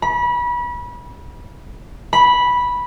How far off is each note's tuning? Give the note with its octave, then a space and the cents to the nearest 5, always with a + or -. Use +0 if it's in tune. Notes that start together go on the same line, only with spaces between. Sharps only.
B5 -30
B5 -10